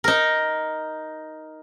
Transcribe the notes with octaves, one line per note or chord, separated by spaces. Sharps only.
D#4 A#4